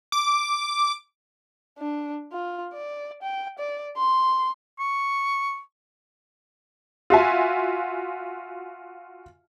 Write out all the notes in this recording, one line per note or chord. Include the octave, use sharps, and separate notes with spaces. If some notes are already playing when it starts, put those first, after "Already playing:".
D6
D4
F4
D5
G5
D5
C6
C#6
F4 F#4 E5 G#5